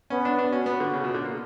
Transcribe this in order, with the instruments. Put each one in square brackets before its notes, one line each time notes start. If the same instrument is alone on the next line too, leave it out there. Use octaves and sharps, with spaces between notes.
[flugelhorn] B3 [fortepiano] C#4
[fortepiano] D4
D4
[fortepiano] C#4 [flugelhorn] F#4
[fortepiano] B3
D3
C#3
B2
D3
A#3